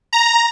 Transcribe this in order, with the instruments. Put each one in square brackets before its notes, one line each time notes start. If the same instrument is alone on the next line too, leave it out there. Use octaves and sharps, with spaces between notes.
[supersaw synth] A#5